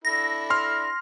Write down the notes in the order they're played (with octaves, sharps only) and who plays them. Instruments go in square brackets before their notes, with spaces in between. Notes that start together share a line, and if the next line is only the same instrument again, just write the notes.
[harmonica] D4 E4 A4 [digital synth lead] A#6
[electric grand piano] C6 F6